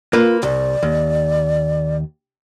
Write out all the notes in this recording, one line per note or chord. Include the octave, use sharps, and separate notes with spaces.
A#3 F4 B4
C2 D5
D#2